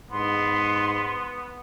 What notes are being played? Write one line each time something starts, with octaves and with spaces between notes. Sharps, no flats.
G#2 B3 C6